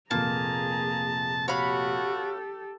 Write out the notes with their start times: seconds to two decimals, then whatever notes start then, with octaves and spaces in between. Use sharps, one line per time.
0.11 F1 A#2 A#3 G#4 A5 A#5
1.48 F#4 G4 A4 C#5 F5 B5